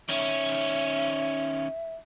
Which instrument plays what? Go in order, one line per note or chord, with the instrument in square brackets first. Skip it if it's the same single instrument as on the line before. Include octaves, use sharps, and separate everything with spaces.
[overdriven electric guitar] D#3 C#4 [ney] E5